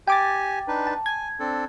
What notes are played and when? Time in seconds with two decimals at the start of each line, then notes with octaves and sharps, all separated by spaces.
0.08 G4 G5 G#5 D6 A6
0.68 D4 D#4 B4
0.87 A5
1.06 G#5 G#6
1.40 C4 D4 A4